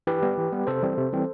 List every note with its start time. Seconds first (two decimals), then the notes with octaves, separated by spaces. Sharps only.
0.07 E3 G4 B4
0.22 G3 B3
0.37 E3
0.52 G3 B3
0.67 C3 A4 C5
0.82 E3 G3 C4
0.97 C3
1.13 E3 G3 C4